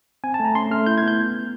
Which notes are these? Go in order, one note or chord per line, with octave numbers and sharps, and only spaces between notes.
C4 G#5
A5
A3
A#5
C#4 C6
A3 F6
E4 G6
G#6
B3 G6